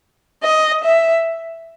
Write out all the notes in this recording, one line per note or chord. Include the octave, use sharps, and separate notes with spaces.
D#5
E5